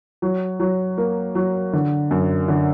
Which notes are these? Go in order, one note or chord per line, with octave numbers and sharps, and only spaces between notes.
F#3
F#3
A#3
F#3
D3
F#2
D3